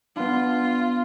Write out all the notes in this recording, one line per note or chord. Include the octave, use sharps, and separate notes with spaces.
B3 D4 F4